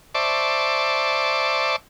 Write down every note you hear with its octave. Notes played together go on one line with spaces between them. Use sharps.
C5 D5 E5 A5 C#6 D6